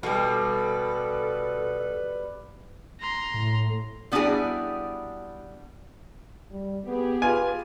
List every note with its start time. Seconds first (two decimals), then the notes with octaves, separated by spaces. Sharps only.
0.03 B2 G3 A4 B4 F5
3.01 A#5 C6
3.34 A2
4.12 G3 B3 D4 E4 F#4 G#4
6.51 G3
6.85 B3 G4 G#4
7.22 F4 B4 G#5